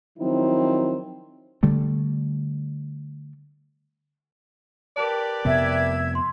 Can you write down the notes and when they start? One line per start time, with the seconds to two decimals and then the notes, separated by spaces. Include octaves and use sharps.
0.18 D#3 F3 F#3 C4 D#4 E4
1.63 D3 G3 A3
4.97 G4 A#4 B4 D5 A5
5.45 F2 C3 B3 E5 E6 G#6
6.15 C6